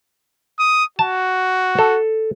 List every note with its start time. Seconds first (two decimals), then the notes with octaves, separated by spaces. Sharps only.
0.59 D#6
0.99 F#4 A5
1.79 A4